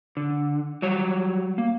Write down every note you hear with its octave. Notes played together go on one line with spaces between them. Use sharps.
D3
F#3 G3 C#5
A#3